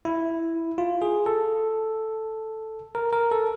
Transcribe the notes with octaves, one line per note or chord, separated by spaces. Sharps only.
E4
F4
G#4
A4
A#4
A#4
A4